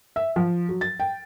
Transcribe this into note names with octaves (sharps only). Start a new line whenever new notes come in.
E5
F3
F#3
A6
G5